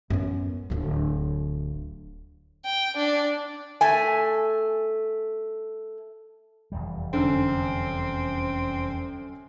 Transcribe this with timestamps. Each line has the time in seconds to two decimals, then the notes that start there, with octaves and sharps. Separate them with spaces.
0.10 F#2 B3
0.70 D1 F#3
2.65 G5
2.96 D4
3.81 A3 G#5
6.72 F1 E2 G3
7.13 F#2 D3 C4